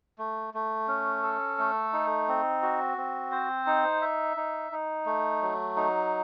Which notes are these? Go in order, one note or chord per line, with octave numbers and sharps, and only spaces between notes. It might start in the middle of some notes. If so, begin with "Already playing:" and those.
A3
A3
C#4
A4
A3
D#4
C4
F#4
C4
C5
D#4
E5
D#4
D#4
A3
F#3
D#4